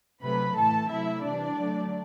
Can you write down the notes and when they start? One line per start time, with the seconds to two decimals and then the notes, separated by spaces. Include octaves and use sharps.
0.22 C3 F#3 A3 B4 B5
0.56 A2 E3 A3 A4 A5
0.89 C3 F#3 A3 E4 E5
1.23 C3 E3 G3 D4 D5
1.56 D3 F#3 A3